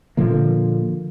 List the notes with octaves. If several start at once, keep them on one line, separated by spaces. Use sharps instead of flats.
A#2 D3 F3 A#3